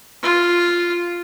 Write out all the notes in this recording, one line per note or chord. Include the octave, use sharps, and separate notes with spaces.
F4